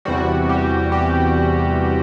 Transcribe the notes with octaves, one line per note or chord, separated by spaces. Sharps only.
E2 C3 E3 G3 F#4
G4
G4